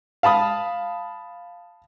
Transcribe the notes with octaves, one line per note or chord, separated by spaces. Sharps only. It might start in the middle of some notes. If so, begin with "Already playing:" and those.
F5 A5 B5 D#6